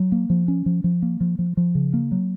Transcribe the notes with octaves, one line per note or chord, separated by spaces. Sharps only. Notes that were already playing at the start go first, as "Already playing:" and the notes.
Already playing: F#3
A#3
F3
C#4
F3
F3
A#3
F3
F3
F3
C#3
A#3
F#3